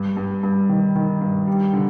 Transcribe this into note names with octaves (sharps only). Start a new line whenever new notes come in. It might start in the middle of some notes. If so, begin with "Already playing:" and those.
Already playing: G2
G2
G2
D#3
D#3
G2
G3
D3